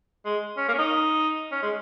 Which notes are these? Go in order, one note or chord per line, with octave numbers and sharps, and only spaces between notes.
G#3
C#4
A#3
C#4
D#4
C#4
G#3